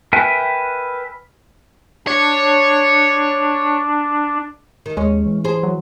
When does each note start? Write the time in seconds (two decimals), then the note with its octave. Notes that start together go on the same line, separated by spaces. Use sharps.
0.13 A#4 B4 E5 G5 G#5
2.07 D4 C#5
4.86 D#3
4.97 D#2 G#3 C#4
5.26 E3
5.44 G#4 C5
5.63 F#3